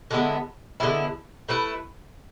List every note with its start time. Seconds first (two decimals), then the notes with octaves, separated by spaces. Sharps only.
0.11 D3 G#3 B3 E4
0.80 D3 G#3 B3 E4
1.49 A3 E4 B4